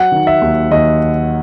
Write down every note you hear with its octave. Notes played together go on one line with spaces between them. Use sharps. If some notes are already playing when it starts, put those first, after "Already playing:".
Already playing: F#3 F#5
D#3
E5
D#2
D#2 D#5